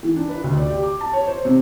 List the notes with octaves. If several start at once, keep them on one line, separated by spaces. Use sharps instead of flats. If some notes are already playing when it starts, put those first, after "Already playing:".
E3
D4
B4
D2
D5
G4
D6
A5
C#5
C5
C3